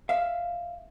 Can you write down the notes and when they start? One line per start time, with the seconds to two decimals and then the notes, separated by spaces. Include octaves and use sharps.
0.09 E5 F5